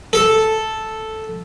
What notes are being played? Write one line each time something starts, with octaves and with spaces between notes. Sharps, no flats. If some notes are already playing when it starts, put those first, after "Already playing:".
A4